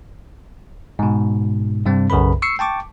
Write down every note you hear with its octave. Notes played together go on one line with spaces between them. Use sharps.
G#2 B2
G2 C3 G3 C4
B1 F#2 C#3 A#4 B4 B5
C#6 E6 C7 C#7
G5 A5 C#6 D6